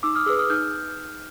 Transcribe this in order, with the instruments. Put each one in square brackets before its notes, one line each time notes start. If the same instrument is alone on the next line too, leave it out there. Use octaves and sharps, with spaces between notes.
[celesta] D#4 D6 E6
D#6 F6
G#4 B4 D6 E6
D#6 F6
D#4 F6 G6